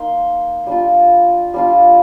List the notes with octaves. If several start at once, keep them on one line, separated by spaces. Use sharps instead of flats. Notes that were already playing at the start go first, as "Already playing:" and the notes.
Already playing: A#3 D#4 C6
G3 D4 F4
G3 D4 F4